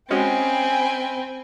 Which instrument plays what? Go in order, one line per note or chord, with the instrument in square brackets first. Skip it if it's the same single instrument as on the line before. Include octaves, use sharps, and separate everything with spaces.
[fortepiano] G#3 C#4 F#4 [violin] C4 [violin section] G5 G#5 B5